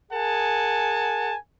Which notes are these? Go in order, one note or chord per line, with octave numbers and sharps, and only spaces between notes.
G#4 A#4 F#5 G#5 A5